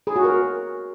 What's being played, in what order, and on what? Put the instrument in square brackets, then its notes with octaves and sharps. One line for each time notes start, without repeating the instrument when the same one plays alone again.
[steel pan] G#4
F#4
A#4